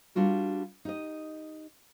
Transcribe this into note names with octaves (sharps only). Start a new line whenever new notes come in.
G3 D4 F4 F#4 A#4
D#4 G4 D#5